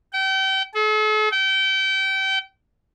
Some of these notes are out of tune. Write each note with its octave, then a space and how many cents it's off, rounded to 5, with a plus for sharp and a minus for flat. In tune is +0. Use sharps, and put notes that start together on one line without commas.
G5 -35
A4 -45
G5 -30